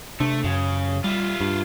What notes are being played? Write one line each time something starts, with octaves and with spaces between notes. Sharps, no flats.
C3 A3 D4
F#2 C#3
G3 F4 E5
G2